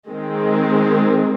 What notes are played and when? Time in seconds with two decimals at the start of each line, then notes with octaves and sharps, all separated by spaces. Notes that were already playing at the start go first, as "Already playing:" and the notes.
0.11 D#3 G#3 C4